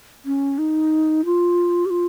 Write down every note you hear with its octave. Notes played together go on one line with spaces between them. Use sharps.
C#4
D#4
F4
G4
F4